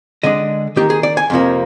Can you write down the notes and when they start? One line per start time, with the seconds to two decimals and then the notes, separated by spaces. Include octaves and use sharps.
0.23 D3 G#3 D4 D#5
0.76 D#3 A#3 D#4 G4
0.90 G#4
1.03 D5
1.17 G#5
1.30 F2 C3 F3 A#3